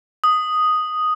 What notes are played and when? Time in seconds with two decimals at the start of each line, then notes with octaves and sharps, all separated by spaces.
0.24 D#6